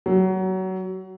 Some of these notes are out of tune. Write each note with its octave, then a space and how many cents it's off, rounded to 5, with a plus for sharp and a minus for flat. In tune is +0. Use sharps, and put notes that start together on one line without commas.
F#3 +25